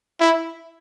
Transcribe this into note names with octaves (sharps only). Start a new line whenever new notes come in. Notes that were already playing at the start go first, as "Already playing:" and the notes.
E4